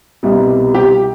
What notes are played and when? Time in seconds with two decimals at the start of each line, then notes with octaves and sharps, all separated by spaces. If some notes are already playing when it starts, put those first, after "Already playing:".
0.23 C2 B2 G3
0.74 G4